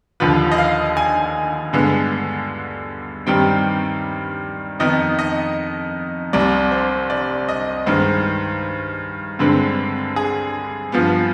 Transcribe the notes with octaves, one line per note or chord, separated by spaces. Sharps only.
D#2 D3 F3 B4
D#5
F5
G#5
G2 D3 G#3 B3
G2 D#3 G3 C4 G5
F2 D#3 B3 D#5
D#5
C2 C3 G3 D5
C5
D5
D#5
G2 D#3 G#3 C5
G2 D3 G#3 C4 B4
G#4
G2 F3 B3